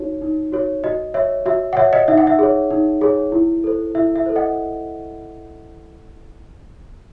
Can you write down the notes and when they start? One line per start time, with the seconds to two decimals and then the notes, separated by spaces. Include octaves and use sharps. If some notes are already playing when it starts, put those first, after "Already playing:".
Already playing: D#4 F#4 C#5
0.21 D#4
0.52 F#4 C#5
0.84 F#4 D#5
1.14 C#5 E5
1.46 F#4 E5
1.73 F#5
1.77 C#5 E5
1.93 D#5
2.08 D#4 E5
2.18 F#5
2.27 E5
2.39 G#4 C#5
2.70 D#4
3.01 G#4 C#5
3.32 E4
3.64 A4 C5
3.95 E4 E5
4.16 E5
4.26 A4 C5
4.36 D#5 F#5